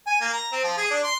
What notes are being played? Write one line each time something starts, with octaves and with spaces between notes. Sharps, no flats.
G#5
A#3
A#5
C4
F3
G#4
D4
C6